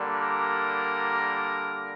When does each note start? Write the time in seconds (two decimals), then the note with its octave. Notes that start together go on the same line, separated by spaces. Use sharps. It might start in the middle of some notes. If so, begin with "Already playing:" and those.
Already playing: D3 G3 A#3
0.13 A#4